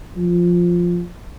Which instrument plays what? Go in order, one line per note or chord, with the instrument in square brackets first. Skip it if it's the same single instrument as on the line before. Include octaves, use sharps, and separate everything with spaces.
[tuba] F3